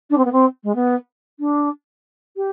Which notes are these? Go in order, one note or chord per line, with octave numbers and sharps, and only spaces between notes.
D4
C4
B3
C4
G#3
B3
D4
G4